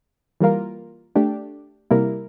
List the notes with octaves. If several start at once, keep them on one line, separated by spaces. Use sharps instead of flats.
E3 G3 A#3 F4 A#4
A3 D4 G4
C3 G3 A#3 E4 A#4